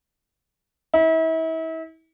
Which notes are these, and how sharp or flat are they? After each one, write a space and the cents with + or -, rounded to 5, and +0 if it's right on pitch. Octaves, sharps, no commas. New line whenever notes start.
E4 -35